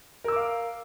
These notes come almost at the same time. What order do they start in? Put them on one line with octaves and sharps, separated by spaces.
A#4 E6 D6 F5